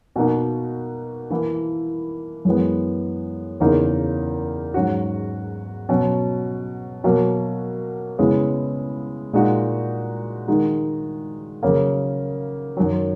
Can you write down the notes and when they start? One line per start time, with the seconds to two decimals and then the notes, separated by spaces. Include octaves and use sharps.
0.16 B2 A#3 D#4 F#4
1.30 E3 A#3 E4
2.45 F#2 E3 G#3 B3
3.60 E2 C#3 E3 A#3 D#4
4.74 G#2 F#3 C#4 F#4
5.89 B2 F#3 C#4
7.04 B2 F#3 A#3
8.19 C#3 G#3 B3 E4
9.33 A#2 G#3 D#4 F#4
10.48 D#3 G#3 D#4 F#4
11.63 C#3 F#3 A#3
12.77 F#2 D#3 F#3